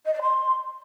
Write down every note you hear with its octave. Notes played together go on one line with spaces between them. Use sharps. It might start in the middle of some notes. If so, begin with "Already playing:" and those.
D#5
D5
C6